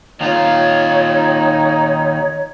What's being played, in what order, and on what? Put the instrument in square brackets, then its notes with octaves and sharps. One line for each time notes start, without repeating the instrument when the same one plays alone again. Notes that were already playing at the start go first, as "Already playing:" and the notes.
[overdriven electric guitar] D#2 F4 [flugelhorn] D#4 [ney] C#5